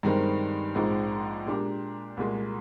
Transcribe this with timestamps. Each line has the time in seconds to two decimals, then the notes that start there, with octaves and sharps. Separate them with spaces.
0.03 G2 D#3 G#3 C4
0.75 A#1 G#2 F3 G#3 C4
1.46 A#2 G#3 D4 G4 A#4
2.17 C2 A#2 G#3